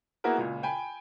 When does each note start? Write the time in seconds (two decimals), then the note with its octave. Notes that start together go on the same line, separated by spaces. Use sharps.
0.24 A#3 B3 E4 F#4 G#4 A#4
0.38 C#2 A#2
0.63 G5 G#5 B5